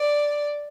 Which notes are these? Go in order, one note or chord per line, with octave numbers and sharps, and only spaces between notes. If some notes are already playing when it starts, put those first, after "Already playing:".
Already playing: D5